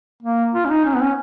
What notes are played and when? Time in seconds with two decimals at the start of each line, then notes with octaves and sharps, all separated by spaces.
0.23 A#3
0.55 F4
0.65 C#4
0.70 D#4
0.85 C#4
0.95 B3
1.02 C#4